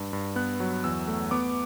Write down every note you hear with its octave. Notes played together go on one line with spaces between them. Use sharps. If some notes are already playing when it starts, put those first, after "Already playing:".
Already playing: G2
G2
B3 F#6
F#3
E2 E6
A3
B3 D6